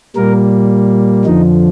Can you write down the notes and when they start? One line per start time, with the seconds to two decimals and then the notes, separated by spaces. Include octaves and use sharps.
0.16 A#2 G3 A#3 A#4
1.25 F2 D3 F3 D#4